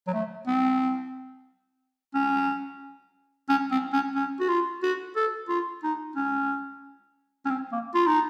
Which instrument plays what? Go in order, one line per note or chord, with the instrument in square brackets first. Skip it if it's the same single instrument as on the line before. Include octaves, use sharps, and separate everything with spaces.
[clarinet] F#3
A3
C4
C#4
C#4
C4
C#4
C#4
F#4
F4
F#4
A4
F4
D#4
C#4
C#4
C4
A#3
F4
D#4